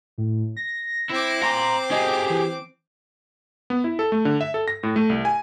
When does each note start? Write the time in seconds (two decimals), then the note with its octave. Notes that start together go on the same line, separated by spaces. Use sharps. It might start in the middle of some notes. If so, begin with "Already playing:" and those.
0.18 A2
0.57 A#6
1.10 C4 E4 D6
1.43 A#5 C6
1.91 G4 G#4 D#5
2.30 E3
3.70 B3
3.84 E4
3.99 A4
4.12 A3
4.25 D3
4.41 E5
4.54 A4
4.68 A#6
4.83 A2
4.96 A3
5.10 C2
5.25 G#5